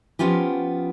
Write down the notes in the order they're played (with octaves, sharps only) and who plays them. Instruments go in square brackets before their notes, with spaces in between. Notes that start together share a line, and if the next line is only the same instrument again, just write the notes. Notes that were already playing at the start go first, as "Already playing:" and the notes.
[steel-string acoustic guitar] F3 G3 B3 C#4 F4 G4